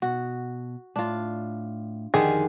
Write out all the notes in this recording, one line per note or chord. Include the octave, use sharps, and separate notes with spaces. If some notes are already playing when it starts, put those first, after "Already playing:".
B2 F#4
A2 D4 F4
F2 D3 D#3 G4 G#4 C6